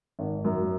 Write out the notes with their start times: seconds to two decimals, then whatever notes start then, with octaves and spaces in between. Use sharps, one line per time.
0.19 G#1
0.44 F#2